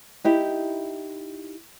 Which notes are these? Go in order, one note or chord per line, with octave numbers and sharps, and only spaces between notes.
D#4 E4 G4